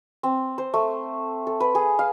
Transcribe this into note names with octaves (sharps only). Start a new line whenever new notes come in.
C4
C5
A3
A4
B4
G#4
F5